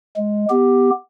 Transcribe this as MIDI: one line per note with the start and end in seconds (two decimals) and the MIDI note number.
0.16 0.45 56
0.50 0.90 59
0.50 0.90 67